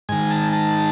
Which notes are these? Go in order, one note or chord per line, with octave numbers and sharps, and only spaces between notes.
G#2 D#3 G#5
A5
A5